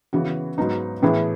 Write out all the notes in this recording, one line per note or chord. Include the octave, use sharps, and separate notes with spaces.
C#3 E3 B3 F#4
G#2 F#3 B3 D#4
A2 E3 B3 E4 G#4